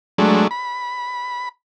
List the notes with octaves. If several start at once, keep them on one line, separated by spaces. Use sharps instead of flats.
F#3 G#3 A3 D4
B5